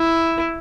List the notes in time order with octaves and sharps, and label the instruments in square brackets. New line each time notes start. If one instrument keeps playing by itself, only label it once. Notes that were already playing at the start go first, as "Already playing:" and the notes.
Already playing: [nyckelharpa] E4